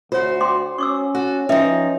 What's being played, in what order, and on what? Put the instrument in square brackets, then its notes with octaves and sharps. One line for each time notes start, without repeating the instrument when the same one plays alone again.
[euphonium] D2 [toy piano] F4 C#5 [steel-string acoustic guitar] F#4 C5
[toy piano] G5 C6 D6
[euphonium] C#4 [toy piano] C#6 D6 E6
[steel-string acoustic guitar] F#4 A4
[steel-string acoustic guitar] F3 D#4 [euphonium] C#4 [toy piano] B4 E5 G5